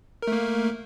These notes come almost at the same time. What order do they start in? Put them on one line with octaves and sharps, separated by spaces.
A#4 A3 A#3